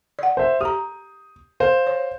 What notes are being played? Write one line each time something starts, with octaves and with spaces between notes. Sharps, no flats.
D5 F#5
C5 E5
G4 A#5 D#6
C5 F5
C#5